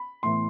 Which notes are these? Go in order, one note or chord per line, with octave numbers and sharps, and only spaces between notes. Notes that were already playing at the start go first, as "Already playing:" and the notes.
Already playing: B5
A2 E3 B3 C6